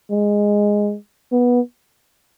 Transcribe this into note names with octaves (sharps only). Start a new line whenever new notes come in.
G#3
B3